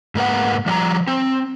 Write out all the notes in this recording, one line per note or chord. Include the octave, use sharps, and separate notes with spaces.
G#2 A#3 A#4 B4 F#5
F3 G3 F#5 A#5
C4